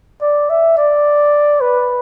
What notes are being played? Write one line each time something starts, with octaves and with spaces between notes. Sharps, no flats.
D5
E5
D5
B4